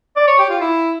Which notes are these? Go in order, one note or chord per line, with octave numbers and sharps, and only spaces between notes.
D5
C#5
G4
F4
E4